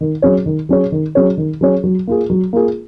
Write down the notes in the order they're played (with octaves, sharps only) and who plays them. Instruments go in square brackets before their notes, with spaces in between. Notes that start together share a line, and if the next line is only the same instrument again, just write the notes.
[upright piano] D#3
F#3 C#4 G#4 C#5
D#3
F#3 C#4 G#4 C#5
D#3
F#3 C#4 G#4 C#5
D#3
F#3 C#4 G#4 C#5
F#3
A#3 F4 G#4
F#3
A#3 F4 G#4